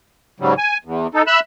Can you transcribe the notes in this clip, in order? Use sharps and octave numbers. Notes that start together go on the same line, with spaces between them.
G#2 C#3 F#3 G3
G#5
E2
D#4 A4
E5 B5 E6 F#6